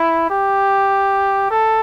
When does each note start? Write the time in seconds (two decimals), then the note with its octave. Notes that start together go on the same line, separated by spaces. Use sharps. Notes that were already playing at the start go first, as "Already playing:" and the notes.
Already playing: E4
0.30 G4
1.51 A4